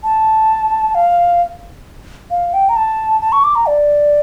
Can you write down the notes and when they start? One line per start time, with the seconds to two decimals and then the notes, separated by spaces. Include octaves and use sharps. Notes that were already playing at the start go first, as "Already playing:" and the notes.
0.04 A5
0.95 F5
2.31 F5
2.54 G5
2.69 A#5
2.76 A5
3.21 A5
3.32 C#6
3.44 D6
3.55 A#5
3.66 D5